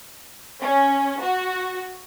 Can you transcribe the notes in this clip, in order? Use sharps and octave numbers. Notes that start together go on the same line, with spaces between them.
C#4
F#4